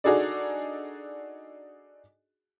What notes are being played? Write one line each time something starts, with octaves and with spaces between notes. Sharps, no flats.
D4 D#4 F#4 G#4 A4 D5